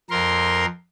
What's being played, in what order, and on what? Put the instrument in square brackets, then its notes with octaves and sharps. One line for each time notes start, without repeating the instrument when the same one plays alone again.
[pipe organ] F2 A#4 C6